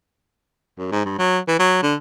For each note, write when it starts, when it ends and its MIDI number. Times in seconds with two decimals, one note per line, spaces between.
0.78 0.92 42
0.92 1.04 44
1.05 1.15 43
1.19 1.39 54
1.48 1.58 52
1.60 1.80 54
1.82 1.95 50